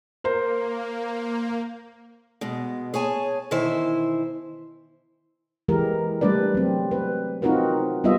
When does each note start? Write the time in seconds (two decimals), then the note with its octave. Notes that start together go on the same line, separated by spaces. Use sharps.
0.24 A#3 A#4 C5
2.41 B2 G#3
2.94 G#4 C#5 G#5 A5
3.51 B2 D#3 E3 E4 C5 E5
5.68 E3 G#3 G4 A#4
6.21 G3 A3 D4 B4 D5
6.54 F#3 C4
6.91 B4
7.42 C4 D#4 F4 F#4 A#4 B4
8.04 G3 B3 F4 D#5 E5